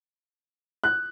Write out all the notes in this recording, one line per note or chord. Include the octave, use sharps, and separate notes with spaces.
F#6